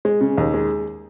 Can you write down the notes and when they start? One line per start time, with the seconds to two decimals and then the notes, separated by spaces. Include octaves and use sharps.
0.05 G#3
0.21 C#3
0.38 D#2
0.54 G#3